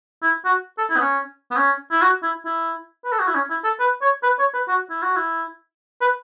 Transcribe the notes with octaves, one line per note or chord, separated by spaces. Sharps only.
E4
F#4
A4
E4
B3
C#4
B3
C#4
E4
F#4
E4
E4
B4
A4
F#4
E4
C#4
E4
A4
B4
C#5
B4
C#5
B4
F#4
E4
F#4
E4
B4